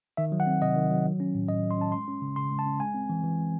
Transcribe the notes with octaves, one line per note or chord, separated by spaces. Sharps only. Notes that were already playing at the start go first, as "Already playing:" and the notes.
D#3 E5
F#3
F#5
C4
C3 D#5
D#3
F#3
F#3
C#4
A2
A2 D#5
F#3
C6
C#4 A5
G#3 C6
C#4
C#3
C#3 C6
G#3
A5
C#4
G#3 G#5
C4
E3
E3
G#3